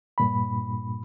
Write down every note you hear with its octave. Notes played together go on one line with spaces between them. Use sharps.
G2 A#2 B5